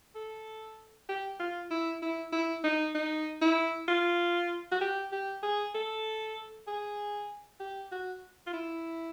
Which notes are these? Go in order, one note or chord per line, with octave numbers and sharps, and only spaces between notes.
A4
G4
F4
E4
E4
E4
D#4
D#4
E4
F4
F#4
G4
G4
G#4
A4
G#4
G4
F#4
F4
E4